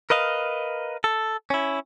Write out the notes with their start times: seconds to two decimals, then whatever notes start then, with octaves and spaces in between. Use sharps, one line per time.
0.10 A#4 B4 D#5 F5
1.04 A4
1.50 C#4 E4